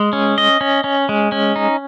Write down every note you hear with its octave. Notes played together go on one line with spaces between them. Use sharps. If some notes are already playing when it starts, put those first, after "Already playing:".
Already playing: G#3
C#4
D#5
C#4
C#4
G#3
C#4
D#4